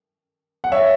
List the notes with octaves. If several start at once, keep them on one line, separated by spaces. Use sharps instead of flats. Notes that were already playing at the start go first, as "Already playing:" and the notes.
F#5
C#5 E5